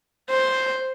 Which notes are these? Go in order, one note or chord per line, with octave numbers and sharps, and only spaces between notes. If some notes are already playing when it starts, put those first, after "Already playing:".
C5